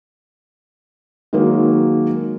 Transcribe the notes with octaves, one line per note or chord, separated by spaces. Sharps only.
D#3 F#3 G#3 A#3